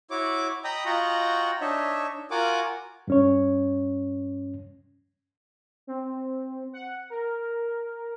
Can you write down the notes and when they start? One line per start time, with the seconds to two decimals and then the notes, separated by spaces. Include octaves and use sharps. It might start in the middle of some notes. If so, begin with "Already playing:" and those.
0.11 E4 F#4 C#5 D6
0.64 D#5 G5 A#5 B5 D#6
0.85 F4 F#4 D#5 F#5 G5 A#5
1.61 D4 D#4 C#5 D#5 E5
2.31 F4 F#4 A#4 F#5 G#5 D6
3.08 G2 C#4 C#5
5.87 C4
6.74 F#5
7.10 A#4